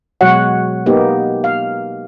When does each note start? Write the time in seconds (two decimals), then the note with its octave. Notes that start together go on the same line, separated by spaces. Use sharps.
0.21 B2 F#3 G#3 F#4 C#5 F#5
0.86 A#3 B3 D#4 G4
1.44 F5